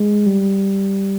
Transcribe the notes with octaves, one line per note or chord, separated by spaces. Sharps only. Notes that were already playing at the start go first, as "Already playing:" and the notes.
Already playing: G#3
G3